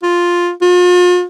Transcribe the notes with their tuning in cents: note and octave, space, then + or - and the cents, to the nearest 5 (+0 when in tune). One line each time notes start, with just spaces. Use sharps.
F4 +5
F4 +40